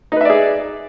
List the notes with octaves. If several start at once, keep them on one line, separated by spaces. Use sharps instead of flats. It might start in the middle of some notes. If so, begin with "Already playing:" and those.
D#4 G#4 B4 D5 E5